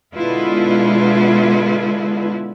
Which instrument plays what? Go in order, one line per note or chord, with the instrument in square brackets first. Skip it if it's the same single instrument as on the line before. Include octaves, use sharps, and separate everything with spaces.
[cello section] B2 D3 G#3 E4 F4 B4